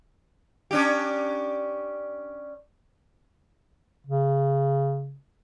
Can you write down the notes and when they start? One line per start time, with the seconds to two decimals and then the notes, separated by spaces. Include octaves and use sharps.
0.71 C#4 D4 G4
4.07 C#3